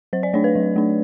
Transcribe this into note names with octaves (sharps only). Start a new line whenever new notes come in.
F#3 C5
D5
A3 D4 C#5
B4
F#3
A3 D4